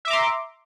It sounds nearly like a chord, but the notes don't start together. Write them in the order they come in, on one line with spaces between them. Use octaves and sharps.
E5 D6 A#5 C6